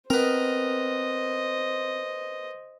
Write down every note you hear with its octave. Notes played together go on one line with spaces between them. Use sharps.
B3 C4 A#4 C5 D#5